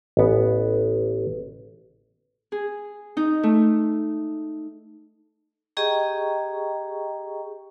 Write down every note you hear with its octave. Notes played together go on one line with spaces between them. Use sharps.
A1 B3
G#4
D#4
A3
G4 G#4 D#5 G5 A#5 C#6